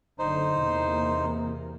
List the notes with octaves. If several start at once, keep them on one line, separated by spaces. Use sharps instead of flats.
F#1 D3 D#4 C5
E2 C3 A#3